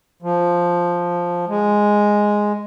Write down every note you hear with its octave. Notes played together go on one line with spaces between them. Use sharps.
F3
G#3